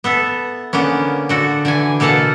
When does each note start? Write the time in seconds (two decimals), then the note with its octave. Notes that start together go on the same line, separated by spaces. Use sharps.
0.04 B3 A4 E5
0.73 D3 A#3 B3 C#4
1.29 D3 F#4 A4
1.65 D3 E3 G#5
2.00 B2 A#3 A4 F5 F#5